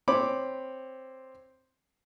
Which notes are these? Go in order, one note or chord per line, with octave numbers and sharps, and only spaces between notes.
C4 C#5 B5 D6